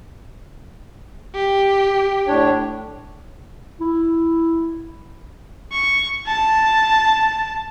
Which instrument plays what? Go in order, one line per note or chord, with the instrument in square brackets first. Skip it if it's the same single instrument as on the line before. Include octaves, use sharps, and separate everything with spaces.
[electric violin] G4
[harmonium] A2 D4 C#5
[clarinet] E4
[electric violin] C#6
A5